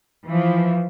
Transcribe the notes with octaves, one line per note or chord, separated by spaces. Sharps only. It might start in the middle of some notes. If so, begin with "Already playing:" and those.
E3 F3